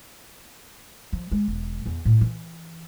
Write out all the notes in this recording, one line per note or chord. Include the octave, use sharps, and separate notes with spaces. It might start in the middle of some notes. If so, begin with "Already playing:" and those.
F3
G#3
E1
E2
A2
E3